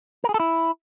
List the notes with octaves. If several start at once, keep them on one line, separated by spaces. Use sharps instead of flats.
A#4
G#4
A4
E4